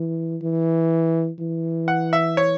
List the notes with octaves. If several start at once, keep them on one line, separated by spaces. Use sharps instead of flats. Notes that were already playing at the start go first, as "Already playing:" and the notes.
Already playing: E3
E3
E3
F#5
E5
C#5